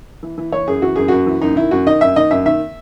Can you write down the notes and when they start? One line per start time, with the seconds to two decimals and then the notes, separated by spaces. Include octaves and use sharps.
0.23 E3
0.38 E3
0.52 E3 C#5
0.67 F#2 G#4
0.82 E3 F#4
0.96 F#2 G#4
1.08 F#2 F#4
1.26 E3
1.42 F#2 D#4
1.56 D#3 E4
1.71 F#2 F#4
1.86 D#3 D#5
2.01 F#2 E5
2.16 D#3 D#5
2.31 F#2 E5
2.45 D#3 E5